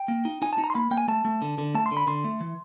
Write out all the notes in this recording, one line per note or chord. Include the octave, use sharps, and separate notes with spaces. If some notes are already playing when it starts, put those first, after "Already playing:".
Already playing: G5
A#3
D#4
D#4 G#5
A5
D#4
A#5
C6
A#3 B5
A#3 G5
G#5
A3 A5
A3
D3
D3
A3 A5
C6
D3
B5
D3 C6
A3
E3